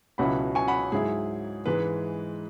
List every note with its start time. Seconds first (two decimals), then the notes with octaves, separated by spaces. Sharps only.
0.18 C#2 B2 F#3 C#4 E4 F#5 B5
0.55 G#5 C#6
0.68 F#5 B5
0.92 G#2 F#3 E4 G#4
1.66 G#2 E3 G#3 B4